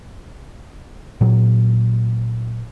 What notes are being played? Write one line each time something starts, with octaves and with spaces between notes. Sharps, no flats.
A#2 F#3